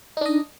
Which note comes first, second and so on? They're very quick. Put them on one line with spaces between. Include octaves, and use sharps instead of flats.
D#4 D4 D#5